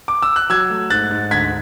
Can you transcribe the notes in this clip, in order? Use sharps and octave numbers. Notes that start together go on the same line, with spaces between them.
D6
E6
F#6
F#3 E6 G#6
A3
G#2 F#6 A6
G#2
D2 G#6 B6